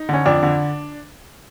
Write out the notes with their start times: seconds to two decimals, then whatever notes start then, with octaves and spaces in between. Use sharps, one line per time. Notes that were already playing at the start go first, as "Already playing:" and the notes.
Already playing: D#4
0.09 D3 C#4
0.26 F2 D4
0.43 D3